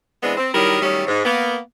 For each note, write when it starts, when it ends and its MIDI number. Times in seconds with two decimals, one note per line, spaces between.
0.23 0.36 52
0.23 0.36 56
0.23 0.36 59
0.23 0.36 60
0.23 0.36 62
0.37 0.50 60
0.54 0.81 51
0.54 0.81 54
0.54 0.81 55
0.54 0.81 64
0.54 0.81 70
0.82 1.03 51
0.82 1.03 54
0.82 1.03 55
0.82 1.03 57
0.82 1.03 61
1.07 1.22 44
1.25 1.57 58
1.25 1.57 59